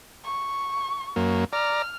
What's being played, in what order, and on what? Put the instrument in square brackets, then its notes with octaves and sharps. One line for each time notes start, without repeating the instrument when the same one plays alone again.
[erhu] C#6
[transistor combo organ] F#2 A#3
[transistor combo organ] D5 A#5 [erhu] F6